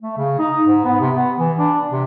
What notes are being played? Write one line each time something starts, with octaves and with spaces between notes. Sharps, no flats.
A3
C#3
D#4
G#2
B3
C3
B3
E3
D4
C3